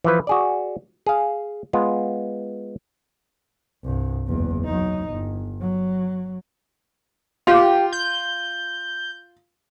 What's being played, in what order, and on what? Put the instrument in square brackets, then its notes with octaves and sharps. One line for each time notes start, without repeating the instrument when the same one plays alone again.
[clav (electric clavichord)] E3 F3 B4
F#4 G#4 D5
G#4 F5
G#3 B3 F4
[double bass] C2 G2
F#1 E2
F#3 D#4
G1
F#3
[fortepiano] F4 [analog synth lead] G4
[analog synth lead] G6